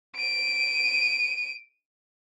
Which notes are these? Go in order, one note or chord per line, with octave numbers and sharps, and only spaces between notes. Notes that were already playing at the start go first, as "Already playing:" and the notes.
D7 D#7